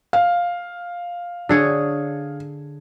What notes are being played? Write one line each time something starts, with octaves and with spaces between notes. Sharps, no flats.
F5
D3 G#4 C#5